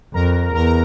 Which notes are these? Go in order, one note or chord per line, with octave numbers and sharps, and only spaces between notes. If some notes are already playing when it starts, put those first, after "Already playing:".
F2 A#4 A#5
E2 A#4 A#5
A#5